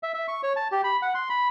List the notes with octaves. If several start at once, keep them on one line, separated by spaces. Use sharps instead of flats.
E5
E5
C#6
C#5
A5
G4
B5
F#5
C6
B5